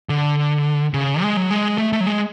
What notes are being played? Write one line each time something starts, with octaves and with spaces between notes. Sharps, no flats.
D3
C#3
G#3
F#3
G#3
A3
A3
F#3
G#3